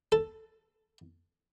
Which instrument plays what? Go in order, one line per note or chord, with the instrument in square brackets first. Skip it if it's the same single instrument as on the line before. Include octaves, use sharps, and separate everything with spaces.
[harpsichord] A4